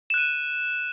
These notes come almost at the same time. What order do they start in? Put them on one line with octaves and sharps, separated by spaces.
E7 F#6 D#7